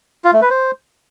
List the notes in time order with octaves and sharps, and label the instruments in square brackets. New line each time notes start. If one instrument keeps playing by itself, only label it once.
[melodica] F4
A3
B4
C5